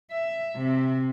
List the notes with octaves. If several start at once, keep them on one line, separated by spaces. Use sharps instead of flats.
E5
C3